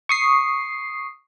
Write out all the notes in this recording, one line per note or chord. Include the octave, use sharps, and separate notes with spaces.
C#6 D#6 C7